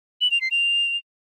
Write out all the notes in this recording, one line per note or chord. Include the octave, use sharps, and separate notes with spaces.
F#7
F7
C7
F7